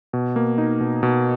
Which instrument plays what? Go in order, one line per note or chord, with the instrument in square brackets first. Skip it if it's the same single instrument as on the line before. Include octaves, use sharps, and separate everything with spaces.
[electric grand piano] B2
A#3
D#4
B2
B2